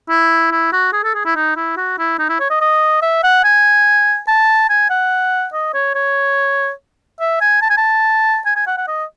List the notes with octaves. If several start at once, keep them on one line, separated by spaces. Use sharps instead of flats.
E4
E4
F#4
G#4
A4
G#4
E4
D#4
E4
F#4
E4
D#4
E4
C#5
D#5
D#5
E5
F#5
G#5
A5
G#5
F#5
D#5
C#5
C#5
E5
G#5
A5
G#5
A5
G#5
G#5
F#5
F#5
D#5